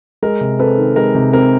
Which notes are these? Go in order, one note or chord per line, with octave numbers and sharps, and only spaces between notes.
G#3 A#4
C3
C4 A4 B4
D#3
G#3 A#4
C3
C4 A#4